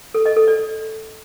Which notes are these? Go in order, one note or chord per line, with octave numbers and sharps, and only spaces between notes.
A4
D#5
A4
D5